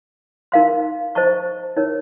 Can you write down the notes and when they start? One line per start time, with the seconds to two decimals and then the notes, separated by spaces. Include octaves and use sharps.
0.52 D#4 A#4 F5 C6
1.15 C5 D#5 A5 C#6
1.77 D#4 A#4 C#5